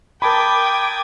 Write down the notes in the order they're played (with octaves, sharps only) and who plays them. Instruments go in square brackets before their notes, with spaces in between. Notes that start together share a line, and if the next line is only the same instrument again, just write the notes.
[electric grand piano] A#4 A5 B5 [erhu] G5 [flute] D6 [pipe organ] D#6 G#6 A6